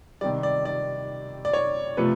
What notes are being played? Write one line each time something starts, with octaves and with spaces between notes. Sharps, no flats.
C3 D#3 G3 D5
D5
D5
D5
C#5
C3 F3 A3 B4